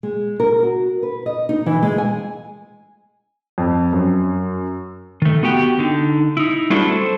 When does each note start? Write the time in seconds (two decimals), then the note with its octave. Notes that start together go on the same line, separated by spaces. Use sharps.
0.03 G#3
0.40 A#4
0.63 F#4
1.03 B4
1.26 D#5
1.49 D#4
1.66 E3
1.82 G#3
1.98 G#5
3.58 F2
3.93 F#2
5.22 D#3 A3
5.43 B3 F#4 G4 G5
5.79 D3 D#4
6.37 D#4 E4
6.70 G3 A3 C4 D4 E4 F#4
6.91 A4 C5